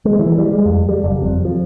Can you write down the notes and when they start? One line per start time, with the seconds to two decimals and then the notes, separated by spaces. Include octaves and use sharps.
0.05 G#3
0.19 E3
0.38 G3
0.52 G#3
0.66 F2
0.89 G3
1.04 F#1
1.22 F2
1.45 F3